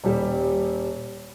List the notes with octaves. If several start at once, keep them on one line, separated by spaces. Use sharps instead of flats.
D#1 G3 G4